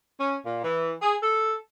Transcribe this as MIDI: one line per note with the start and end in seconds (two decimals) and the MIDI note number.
0.20 0.37 61
0.46 0.61 46
0.64 0.95 52
1.02 1.15 68
1.23 1.56 69